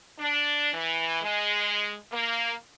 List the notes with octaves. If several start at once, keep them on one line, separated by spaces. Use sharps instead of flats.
D4
E3
G#3
A#3